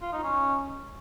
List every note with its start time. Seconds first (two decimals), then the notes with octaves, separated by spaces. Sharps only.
0.02 F4
0.12 D#4
0.23 C#4